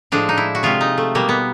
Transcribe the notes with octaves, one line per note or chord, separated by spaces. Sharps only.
A2 F3 G#3 D4
D#4
E4
F#4
C3 F3 G#3 F4
D#4
A3
B2 G3 A#3
B3